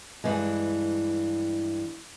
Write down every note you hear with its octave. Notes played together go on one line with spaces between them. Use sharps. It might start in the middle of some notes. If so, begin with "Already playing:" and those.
G2 E3 G#3